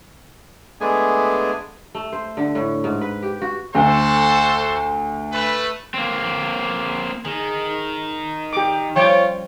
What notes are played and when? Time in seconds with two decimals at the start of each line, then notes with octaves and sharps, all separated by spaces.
0.81 G#3 A3 B3 D4 G#4 G#5
1.95 A3
2.13 C5
2.37 D3
2.55 A2
2.84 G#2
3.01 B4
3.22 G4
3.42 F#4
3.75 D2 F#4 A4 C5
5.32 A3 B4
5.94 A#3 C4
7.25 D#3 G#4
8.53 G4 D6
8.96 F3 G3 C#4 F4 C#5 G5 D6